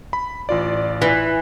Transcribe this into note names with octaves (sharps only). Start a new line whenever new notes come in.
B5
A1 F4 D5
E3